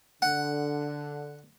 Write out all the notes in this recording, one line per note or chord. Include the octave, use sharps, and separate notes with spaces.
D3 F#5